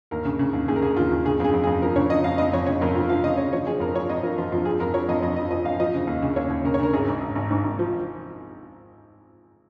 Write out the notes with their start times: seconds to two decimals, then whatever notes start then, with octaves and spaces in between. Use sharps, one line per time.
0.11 D#2 A#4
0.25 C#3
0.39 C#3
0.53 D#2
0.68 D#2 G#4
0.76 A#4
0.82 C#3 G#4
0.97 D#2 F4
1.11 D#2
1.25 C#3 G#4
1.40 F2 G#4
1.53 F2
1.63 G#4
1.67 F2
1.82 F3 A#4
1.96 C#3 C#5
2.10 F3 D#5
2.24 F2 F5
2.38 F2 D#5
2.53 F2 C#5
2.66 C#3 C#5
2.81 F2 A#4
2.95 C#3 F4
3.09 F3 F5
3.23 C#3 D#5
3.37 C#3 C#5
3.53 F3 C#5
3.66 F3 G#4
3.80 F2 A#4
3.94 F3 C#5
4.09 F2 D#5
4.23 F3 A#4
4.38 F3 F4
4.52 F2 F4
4.65 F3 G#4
4.80 F2 A#4
4.94 F3 C#5
5.08 F2 D#5
5.22 F2 D#5
5.36 F3 D#5
5.50 F3 D#5
5.65 F2 F5
5.80 F3 D#5
5.94 C#3
6.07 D#2
6.22 C#3
6.36 D#2 C#5
6.50 D#2
6.65 C#3 A#4
6.74 C#5
6.80 C#3 A#4
6.93 G#1 G#4
7.08 G#2
7.21 G#1
7.35 G#1
7.51 G#2
7.64 G#1
7.79 F3